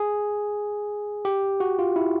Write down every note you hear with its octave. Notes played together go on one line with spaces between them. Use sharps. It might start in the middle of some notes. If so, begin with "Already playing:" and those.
Already playing: G#4
G4
F#4
F4
E4